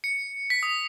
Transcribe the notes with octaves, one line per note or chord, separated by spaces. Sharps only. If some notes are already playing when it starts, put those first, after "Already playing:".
C#7
B6
D#6